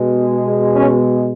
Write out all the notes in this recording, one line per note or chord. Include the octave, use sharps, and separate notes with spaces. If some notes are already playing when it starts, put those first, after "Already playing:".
Already playing: B2 G#3
C#4